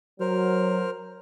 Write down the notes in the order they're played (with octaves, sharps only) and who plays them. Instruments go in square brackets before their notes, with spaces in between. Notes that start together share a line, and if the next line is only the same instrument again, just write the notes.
[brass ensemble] F#3 [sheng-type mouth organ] A#4 C5 F6